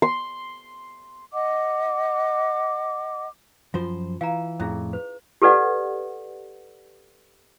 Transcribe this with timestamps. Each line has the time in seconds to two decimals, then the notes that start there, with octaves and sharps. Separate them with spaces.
0.02 C6
1.32 D#5 F#5 D6
3.74 F#2 F3 F4 C5
4.21 E3 F5 A#5
4.60 F2 A2 C#4 E4 G#4
4.93 B4
5.42 G4 A4 B4 D5 F#5